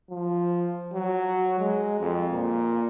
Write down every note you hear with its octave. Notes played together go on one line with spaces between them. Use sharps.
F3
F#3
G#3
F2
A#2